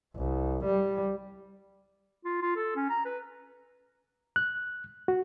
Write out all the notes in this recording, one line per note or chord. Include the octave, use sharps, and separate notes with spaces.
C2
G3
F4
F4
A4
C#4
A#5
B4
F#6
F#4